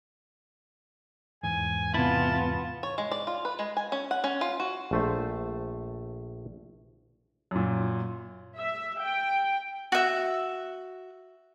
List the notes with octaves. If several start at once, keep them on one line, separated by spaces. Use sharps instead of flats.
E2 G#2 G#5
C3 B3 E4 F4 A5
C#5
G#3
D5
F4
B4
G#3
G#5
C#4
F#5
C#4
F4
F#4
A#1 A3 C5
F#2 A#2
E5
G5
F#4 E5